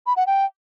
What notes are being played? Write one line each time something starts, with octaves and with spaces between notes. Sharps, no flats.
B5
F#5
G5